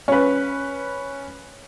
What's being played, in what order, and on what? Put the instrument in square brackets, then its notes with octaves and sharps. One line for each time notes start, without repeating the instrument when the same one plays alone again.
[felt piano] C#4 B4